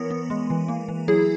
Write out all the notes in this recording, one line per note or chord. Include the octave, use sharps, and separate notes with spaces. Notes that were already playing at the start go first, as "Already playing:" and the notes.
Already playing: E3 B3 A#4 C#5
B3
G#3
E3
A#3
E3
F#3 E4 G#4